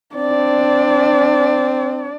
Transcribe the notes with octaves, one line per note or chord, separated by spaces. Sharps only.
C4 D4 D5